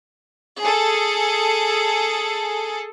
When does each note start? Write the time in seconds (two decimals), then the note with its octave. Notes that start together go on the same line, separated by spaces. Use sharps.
0.60 G#4 A4